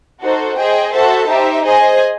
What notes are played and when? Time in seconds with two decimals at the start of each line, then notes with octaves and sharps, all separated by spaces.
0.21 D#4 F#4 A4 C5
0.58 G#4 C5 D#5 G5
0.93 F#4 A4 C5 E5 A5
1.29 D#4 G4 C5 E5
1.64 G#4 C5 D#5 G#5